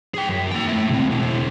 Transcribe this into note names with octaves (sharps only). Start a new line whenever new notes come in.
G#4 G5
F#2
A#3 G5
A3 E4
C#2 C4
B2 E4